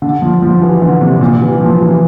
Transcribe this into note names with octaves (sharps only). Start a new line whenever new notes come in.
D3
F3
F3
E3
D3
C3
C3
A#2
E3
F3
E3